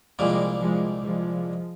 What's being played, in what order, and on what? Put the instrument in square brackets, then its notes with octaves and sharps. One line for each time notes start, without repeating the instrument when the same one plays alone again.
[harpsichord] C2 A#2 G3 A#3 [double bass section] F3 G#3
[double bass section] F3 G#3
F3 G#3